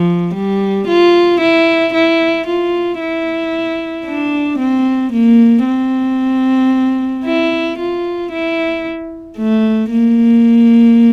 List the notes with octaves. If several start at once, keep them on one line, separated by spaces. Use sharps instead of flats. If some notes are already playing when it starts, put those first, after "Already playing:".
Already playing: F3
G3
F4
E4
E4
F4
E4
D4
C4
A#3
C4
E4
F4
E4
A3
A#3